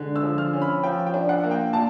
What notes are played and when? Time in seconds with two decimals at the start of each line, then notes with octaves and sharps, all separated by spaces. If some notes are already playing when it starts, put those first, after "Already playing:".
Already playing: D3 G#3
0.16 E6
0.23 F3
0.38 F6
0.53 C#4
0.62 B5
0.83 F3 G5
1.07 G5
1.14 D4
1.29 F#5
1.44 A#3
1.51 G5
1.73 A#2 A5